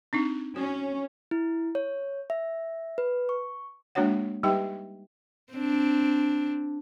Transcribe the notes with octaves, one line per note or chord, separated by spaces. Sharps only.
C4 D4 D#4
C#4 F#4
E4
C#5
E5
B4
C#6
G#3 A#3 D4 F#4 C#5 F#5
G3 D#4 G4 B4 E5 G5
C4 D4